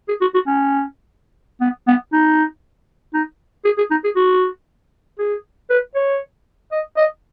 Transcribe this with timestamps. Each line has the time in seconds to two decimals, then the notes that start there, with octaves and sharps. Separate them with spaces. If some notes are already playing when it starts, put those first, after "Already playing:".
0.09 G#4
0.21 F#4
0.35 F#4
0.47 C#4
1.61 B3
1.88 B3
2.13 D#4
3.14 D#4
3.65 G#4
3.78 G#4
3.91 D#4
4.05 G#4
4.16 F#4
5.19 G#4
5.70 B4
5.95 C#5
6.72 D#5
6.97 D#5